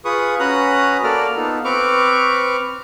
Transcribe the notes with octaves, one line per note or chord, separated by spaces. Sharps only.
F4 G#4 B4 C#6 D#6
C#4 F#4 B4 A#5 D#6 F#6
A#3 F#4 A4 D5 F6
B3 D#4 F4 A4
C4 B4 C#6 D6 F6